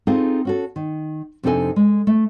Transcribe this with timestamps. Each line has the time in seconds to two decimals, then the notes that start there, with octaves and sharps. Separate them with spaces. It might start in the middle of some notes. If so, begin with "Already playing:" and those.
0.07 C4 D#4 F4 G#4 A4
0.45 C#4 F#4 A4
0.76 D#3
1.43 F2 C3 D4 D#4 A4 G#5
1.76 G#3
2.07 A3